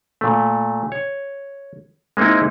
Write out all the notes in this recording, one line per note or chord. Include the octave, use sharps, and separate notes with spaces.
A#2 A3
C#5
G#3 A#3 C4 D#4 E4